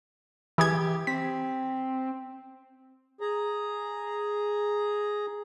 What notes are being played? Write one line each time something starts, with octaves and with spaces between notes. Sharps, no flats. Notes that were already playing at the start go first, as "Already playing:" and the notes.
E3 G4 G#4 G#6
C4 B6
G#4 A#5